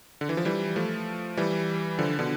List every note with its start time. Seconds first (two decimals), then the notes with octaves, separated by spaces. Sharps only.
0.21 D3
0.29 E3
0.37 F3
0.45 E3 G3
0.76 F3 A3
1.37 E3 G3
1.98 D3 F3
2.19 B2 D3